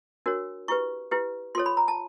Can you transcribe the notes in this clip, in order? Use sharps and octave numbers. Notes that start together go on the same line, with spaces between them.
D4 F#4 A#4 C#5
E4 G4 B4 C#6
E4 G4 B4
F4 A4 C#5 C6
B5
A#5
A5